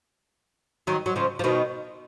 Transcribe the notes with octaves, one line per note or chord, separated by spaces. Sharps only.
D#3 F#3
F#3
C#3 F3
F3
B2 D#3